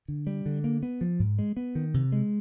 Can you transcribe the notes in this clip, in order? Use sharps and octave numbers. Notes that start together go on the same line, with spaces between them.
D3
G3
D3
A#3
B3
F3
G#2
G#3
B3
D#3
C3
G#3